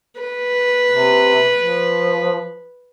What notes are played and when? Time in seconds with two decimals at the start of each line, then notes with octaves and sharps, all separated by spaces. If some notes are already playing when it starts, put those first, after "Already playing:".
0.20 B4
0.90 C3
1.57 F3